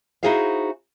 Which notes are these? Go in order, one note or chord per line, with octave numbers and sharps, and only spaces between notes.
D#4 E4 F#4 G#4 C5 F5